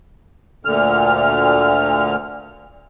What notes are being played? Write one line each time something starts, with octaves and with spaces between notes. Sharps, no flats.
D2 A#2 D3 F6